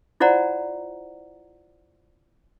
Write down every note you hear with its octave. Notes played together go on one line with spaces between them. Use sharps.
E4 F4 C5 D5 F#5 A#5